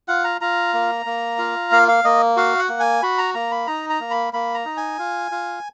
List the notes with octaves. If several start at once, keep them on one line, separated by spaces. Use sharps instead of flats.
F4 F#5
A#5
F4 A#5
A#3
A#3
F4
A#3 F5
F5
A#3 D#5
F#4 F5
F#5
A#3
G#5
F#4 B5
A#5
A#3 A#5
B5
D#4 A#5
A#5
A#3
B5
A#3 B5
A#5
D#4
G#5
F4
F4